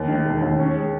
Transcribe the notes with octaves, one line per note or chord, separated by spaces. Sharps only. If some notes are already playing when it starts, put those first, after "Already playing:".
Already playing: D#2
D#3
E1
D#2
C#4
G#3